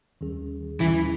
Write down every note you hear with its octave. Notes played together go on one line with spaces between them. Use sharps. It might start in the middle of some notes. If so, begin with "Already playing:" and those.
D#2 D#3 G3 C#4 G#4
D#2 D#3 E3 G3 C#4 G#4